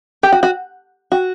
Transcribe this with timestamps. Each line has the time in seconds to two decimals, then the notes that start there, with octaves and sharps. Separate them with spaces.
0.23 G4
0.32 F#4
0.43 F#4
1.12 F#4